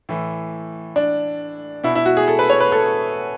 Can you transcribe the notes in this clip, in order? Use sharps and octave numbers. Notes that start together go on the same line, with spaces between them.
A2 E3
D4
B2 E4
E4
F#4
G#4
A4
B4
C#5
B4
A4